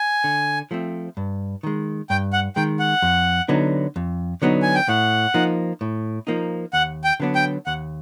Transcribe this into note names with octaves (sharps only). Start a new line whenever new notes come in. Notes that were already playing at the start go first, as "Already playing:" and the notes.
Already playing: G#5
D3
F3 A3 C4
G2
D#3 G#3
G2 G5
F#5
D#3 G#3 G5
F#5
F2
D3 F#3 B3 D#4
F2
D3 F#3 B3 D#4
G#5
G5
A2 F#5
F3 A#3 D#4
A2
F3 A#3 D#4
D#2 F#5
G5
D3 F#3 B3 D4
G5
D#2 F#5